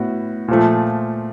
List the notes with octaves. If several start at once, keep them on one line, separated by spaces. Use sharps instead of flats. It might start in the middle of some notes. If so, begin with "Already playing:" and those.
Already playing: A2 B3 F#4
A#2 F3 A3